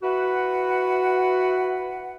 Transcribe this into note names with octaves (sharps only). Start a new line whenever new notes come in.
E4 F#4 B4 F#5